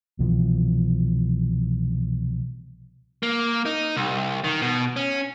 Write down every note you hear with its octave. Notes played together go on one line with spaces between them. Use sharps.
C2 B2 E3 F3
A#3
D#4
C2
D#3
B2
C#4